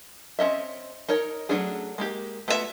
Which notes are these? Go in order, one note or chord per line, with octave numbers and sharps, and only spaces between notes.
C4 C#4 D#5 E5
D#4 A#4 C#5
F#3 A3 C#4 D4 G#4
G#3 A#3 G4
A3 B3 F4 G#4 E5